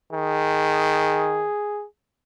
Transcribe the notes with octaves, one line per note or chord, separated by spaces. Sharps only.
D#3 G#4